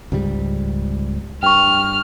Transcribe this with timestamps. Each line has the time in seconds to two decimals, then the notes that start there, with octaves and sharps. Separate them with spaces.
0.12 C#2 G#2 G3
1.43 G2 G5 C#6 F6